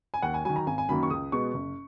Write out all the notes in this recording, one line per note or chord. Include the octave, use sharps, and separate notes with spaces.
G#5
D#2 F#5
G#5
D#3 F#3 G#5
A#5
G#1 G#5
G#5
F#2 D#3 F#3 A#3 B5
C#6
C#2 D#6
B2 G#3 B3 C#6
F#1